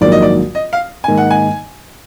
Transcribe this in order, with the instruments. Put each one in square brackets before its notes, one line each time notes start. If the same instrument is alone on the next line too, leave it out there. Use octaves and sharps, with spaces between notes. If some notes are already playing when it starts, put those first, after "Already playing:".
[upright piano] A#1 G#2 D#3 F#3 A#3 [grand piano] D5
[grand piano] D#5
D5
D#5
F5
[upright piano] G#2 D#3 A#3 D#4 [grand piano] G#5
[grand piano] F#5
G#5